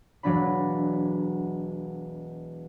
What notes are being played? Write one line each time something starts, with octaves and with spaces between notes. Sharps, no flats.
E1 F#3 D4 B5